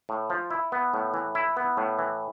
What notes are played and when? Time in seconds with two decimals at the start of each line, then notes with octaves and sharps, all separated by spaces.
0.09 A2
0.30 F3
0.51 E4
0.72 B3
0.94 A2
1.14 E3
1.35 E4
1.57 B3
1.77 A2
1.99 E3